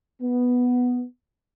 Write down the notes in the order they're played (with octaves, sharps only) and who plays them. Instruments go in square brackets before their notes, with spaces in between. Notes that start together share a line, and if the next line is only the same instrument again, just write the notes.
[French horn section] B3